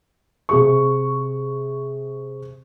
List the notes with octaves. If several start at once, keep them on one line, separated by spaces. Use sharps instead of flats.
C3 G#4 C#6